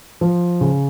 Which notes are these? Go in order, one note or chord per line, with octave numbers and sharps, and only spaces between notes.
F3
C#3